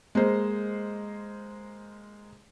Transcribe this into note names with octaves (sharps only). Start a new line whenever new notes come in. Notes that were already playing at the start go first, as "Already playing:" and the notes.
G#3 A#3 C5